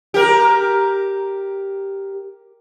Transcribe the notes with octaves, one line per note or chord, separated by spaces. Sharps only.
G4 A#4